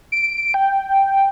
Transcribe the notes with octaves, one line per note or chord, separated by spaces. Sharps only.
D7
G5